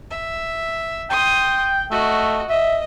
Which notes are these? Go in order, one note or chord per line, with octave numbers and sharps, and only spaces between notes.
E5
G5 C6 D#6
A3 F#4 D#5
D#5 E5